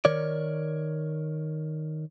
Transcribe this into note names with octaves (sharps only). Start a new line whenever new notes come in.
D#3 A#4 C#5 D5